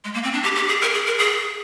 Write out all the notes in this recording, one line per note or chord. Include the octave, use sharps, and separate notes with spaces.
G#3
A#3
C4
D4
G4
G4
G#4
A#4
G#4
A#4
G#4